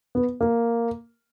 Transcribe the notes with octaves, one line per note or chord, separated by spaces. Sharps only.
B3
A#3